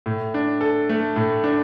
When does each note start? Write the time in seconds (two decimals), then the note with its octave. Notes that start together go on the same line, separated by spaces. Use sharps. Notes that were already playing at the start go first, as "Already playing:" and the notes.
0.06 A2
0.34 D4
0.61 A4
0.89 A3
1.16 A2
1.44 D4